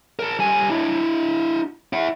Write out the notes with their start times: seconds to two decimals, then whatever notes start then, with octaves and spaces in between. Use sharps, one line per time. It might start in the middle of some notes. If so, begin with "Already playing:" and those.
0.19 A#4 A5
0.39 G3 G#5
0.69 D4 E4
1.93 E4 F#5